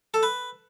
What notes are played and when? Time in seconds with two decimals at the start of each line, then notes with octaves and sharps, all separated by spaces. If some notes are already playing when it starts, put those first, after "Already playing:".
0.14 A4
0.23 B4